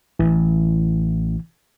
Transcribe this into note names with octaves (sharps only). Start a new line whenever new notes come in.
A1 E3